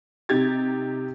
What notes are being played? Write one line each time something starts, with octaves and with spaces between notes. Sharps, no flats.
C3 D#4 G4 G#6 A6